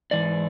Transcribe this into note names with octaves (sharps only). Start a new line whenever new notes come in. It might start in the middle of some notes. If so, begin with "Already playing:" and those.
G#2 E3 D5